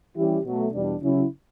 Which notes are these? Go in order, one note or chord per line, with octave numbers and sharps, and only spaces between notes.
E3 G3 C#4 E4 G4
B2 F#3 A3
E2 B2 G3 D4
C#3 F#3 C#4 E4